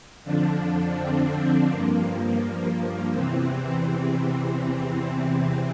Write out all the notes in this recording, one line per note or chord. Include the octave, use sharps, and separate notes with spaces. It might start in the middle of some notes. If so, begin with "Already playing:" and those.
F2 D3 F3 D4
C4
G2 F3 A#3
E2 C3 E3 C4